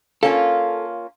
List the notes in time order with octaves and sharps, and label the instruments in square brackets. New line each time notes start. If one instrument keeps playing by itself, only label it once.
[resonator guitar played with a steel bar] A#3 C#4 F4 [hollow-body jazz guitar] A4 [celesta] F5